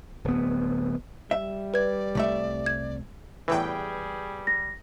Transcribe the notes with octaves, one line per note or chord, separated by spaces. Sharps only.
D1 B3
G3 E5
B4 D5 G#6
C2 A3 E5
G#6
E2 A2 E3 G3 G#4 B4 G5
A#6